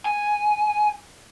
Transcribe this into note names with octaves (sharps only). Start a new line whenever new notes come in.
G#5